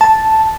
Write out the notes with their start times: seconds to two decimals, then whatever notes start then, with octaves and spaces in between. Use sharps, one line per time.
0.01 A5